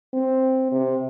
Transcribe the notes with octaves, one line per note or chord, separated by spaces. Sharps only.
C4
C3